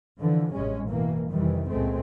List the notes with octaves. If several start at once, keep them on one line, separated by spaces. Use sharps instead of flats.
D3 E3 F3
A1 G2 C3 G#3 C#4
G2 B2 E3 A#3
F2 C3 D#3 E3 G3
C#2 A#2 G#3 A3 C4